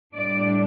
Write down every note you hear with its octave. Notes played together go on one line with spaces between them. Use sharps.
A2 G3 D4 D5